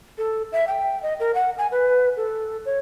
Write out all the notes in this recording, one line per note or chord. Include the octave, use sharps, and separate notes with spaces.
A4
E5
G5
D#5
A#4
F#5
G#5
B4
A4
C#5